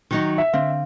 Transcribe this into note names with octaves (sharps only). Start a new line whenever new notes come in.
D#3 F#3 D#4
E5
D3 C4 F5